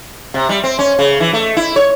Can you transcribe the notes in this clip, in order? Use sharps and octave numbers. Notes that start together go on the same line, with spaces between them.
C3
G3
C4
C#4
C#3
E3
A3
E4
C#5